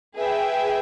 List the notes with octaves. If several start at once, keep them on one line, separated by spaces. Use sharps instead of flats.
G#4 B4 E5 G5